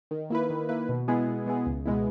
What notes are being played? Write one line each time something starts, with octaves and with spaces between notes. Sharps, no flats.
D#3
A#3 E4 B4
D#3
A#3 E4 B4
B2
G#3 B3 E4 G#4
B2
G#3 B3 E4 G#4
C#2
B2 G#3 B3 E4